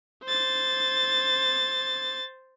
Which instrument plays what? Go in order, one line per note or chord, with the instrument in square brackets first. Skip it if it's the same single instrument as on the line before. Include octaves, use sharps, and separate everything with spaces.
[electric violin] C5 A6